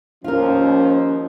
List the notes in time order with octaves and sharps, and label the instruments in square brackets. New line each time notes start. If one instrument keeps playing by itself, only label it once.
[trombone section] D#2 F3 [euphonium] C#4 [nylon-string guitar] F4 A#4